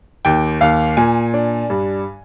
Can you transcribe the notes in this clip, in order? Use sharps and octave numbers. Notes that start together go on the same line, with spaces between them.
D#2 G5
D#2 F5
A#2 G#5
D4
G2